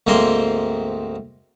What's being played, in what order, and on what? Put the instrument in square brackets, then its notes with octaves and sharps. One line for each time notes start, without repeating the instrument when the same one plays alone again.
[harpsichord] D2 G#2 A#3 C4 A#4 C6